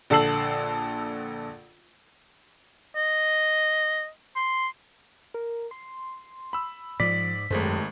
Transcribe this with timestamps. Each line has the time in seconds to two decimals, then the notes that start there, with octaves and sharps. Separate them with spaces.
0.10 A#1 D3 A4 E6 C7 F#7
2.96 D#5
4.36 C6
5.34 A#4
5.71 C6
6.53 B5 E6
7.00 G#2 F3 D5 B6
7.50 G#1 F#2 G#3 A3 C5
7.63 G4